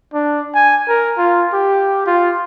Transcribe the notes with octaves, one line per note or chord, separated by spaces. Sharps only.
D4
G#5
A#4
F4
G4
F4